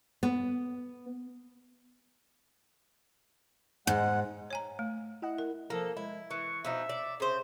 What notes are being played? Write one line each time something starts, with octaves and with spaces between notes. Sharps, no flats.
B3
G#2 G#3 F#5
C#5 G#5 A#5
A3
E4 D#5 F#5
A#4
F3 A#3 A4
G#3 E4
E3 C#6
B2 F3 D#4 E5
D5
C#3 C5